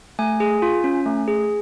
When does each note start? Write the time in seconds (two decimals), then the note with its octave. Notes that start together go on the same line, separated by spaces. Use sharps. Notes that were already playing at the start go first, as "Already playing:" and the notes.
0.19 A3 G#5
0.40 G#4
0.62 F4
0.84 C#4
1.06 A3
1.28 G#4